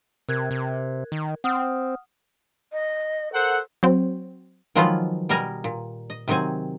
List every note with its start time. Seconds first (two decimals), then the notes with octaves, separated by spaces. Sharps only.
0.29 C3 A#4 F#6 G#6
0.51 C3
1.12 D#3
1.44 C4 F#5 D#6 F6
2.72 D#5
3.33 A4 A#4 C5 F#5
3.83 F#3 C4
4.75 D#3 F3 F#3 G#3 B3 F4
5.29 B2 G3 A#4 D#5 G#5 A#5
5.64 A#2
6.10 D#5
6.28 C3 D#3 F#3 C4 G#5